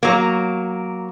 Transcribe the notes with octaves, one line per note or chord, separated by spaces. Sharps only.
F#3 A#3